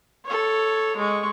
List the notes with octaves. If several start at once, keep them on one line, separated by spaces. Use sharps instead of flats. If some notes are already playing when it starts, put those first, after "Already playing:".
A4 C#5
G#3 C#6